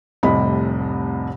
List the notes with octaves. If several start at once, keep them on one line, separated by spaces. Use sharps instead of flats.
F1 C2 A2 C3 D#5 B5